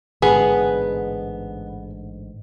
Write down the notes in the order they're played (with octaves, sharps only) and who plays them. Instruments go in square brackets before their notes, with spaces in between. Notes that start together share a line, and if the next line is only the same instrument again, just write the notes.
[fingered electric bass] A1 G#2 D3 [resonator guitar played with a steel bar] B3 [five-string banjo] G#4